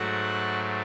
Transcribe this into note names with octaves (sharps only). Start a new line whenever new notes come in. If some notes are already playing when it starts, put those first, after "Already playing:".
Already playing: G#2 F#3 A3 F#4 F#5